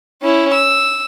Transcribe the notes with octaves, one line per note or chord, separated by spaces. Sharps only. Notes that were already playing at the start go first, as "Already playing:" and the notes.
C#4 E4
E6